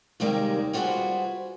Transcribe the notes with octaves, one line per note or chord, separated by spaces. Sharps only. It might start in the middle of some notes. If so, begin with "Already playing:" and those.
D#2 C3 G3 G#3 A#3
G3 F4 F#4 G#4 B4 C5